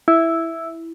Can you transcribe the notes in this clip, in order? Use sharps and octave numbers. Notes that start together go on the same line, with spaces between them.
E4